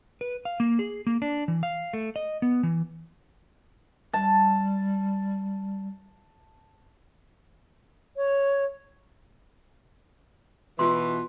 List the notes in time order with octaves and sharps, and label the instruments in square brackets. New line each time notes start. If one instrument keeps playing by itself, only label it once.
[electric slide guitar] B4
F5
A#3
G#4
A#3
D4
E3
F5
A3
D#5
B3
E3
[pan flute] G3 [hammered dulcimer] A5
[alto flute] C#5
[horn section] B2 E3 [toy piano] F4 C6